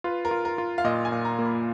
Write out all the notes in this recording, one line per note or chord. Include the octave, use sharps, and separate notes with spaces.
F4 B4
A#4
F4
A#4
F4
F5
A#2 D#5
G#5
A#2
A#5
A#3
B5